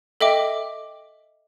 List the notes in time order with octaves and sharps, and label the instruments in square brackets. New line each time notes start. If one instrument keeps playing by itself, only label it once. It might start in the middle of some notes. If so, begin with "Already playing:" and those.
[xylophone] A4 D#5 E5 G5 D6